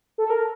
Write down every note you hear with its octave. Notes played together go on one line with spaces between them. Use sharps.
A4
A#4